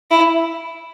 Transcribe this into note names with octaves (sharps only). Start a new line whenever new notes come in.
E4